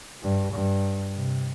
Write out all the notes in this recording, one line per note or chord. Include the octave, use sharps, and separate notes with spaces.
G2
G2
C3